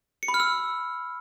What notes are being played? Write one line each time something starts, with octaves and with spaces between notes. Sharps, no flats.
C#7
B5
F6
E6